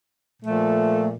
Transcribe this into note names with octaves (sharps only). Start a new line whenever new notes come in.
A#2 F3 A3